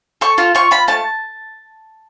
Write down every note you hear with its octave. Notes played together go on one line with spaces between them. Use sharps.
A4 C#6
F4
F4 C#6
F4 B5
A3 A5